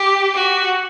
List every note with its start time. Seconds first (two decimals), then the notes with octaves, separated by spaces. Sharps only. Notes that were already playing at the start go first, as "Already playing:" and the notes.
Already playing: G4
0.35 F#4